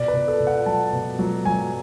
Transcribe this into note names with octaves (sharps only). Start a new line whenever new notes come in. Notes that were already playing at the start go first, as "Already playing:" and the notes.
Already playing: B2 D5
B4
B2
A4
B2
F#5
F#3 A5
B2
F#3
F#3 G#5